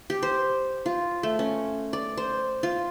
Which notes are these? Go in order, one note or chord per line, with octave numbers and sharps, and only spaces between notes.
G4
C5
F4
A3
C#4
D5
C5
F4